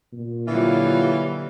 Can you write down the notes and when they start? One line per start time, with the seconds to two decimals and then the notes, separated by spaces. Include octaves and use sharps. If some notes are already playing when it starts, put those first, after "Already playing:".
0.13 A#2
0.47 D3 E3 F#3 G3 F4